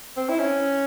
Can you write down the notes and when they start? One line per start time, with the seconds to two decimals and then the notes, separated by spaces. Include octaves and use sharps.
0.17 C4
0.29 E4
0.40 C#4